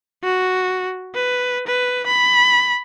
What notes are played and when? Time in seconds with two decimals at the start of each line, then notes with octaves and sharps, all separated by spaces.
0.24 F#4
1.15 B4
1.67 B4
2.07 B5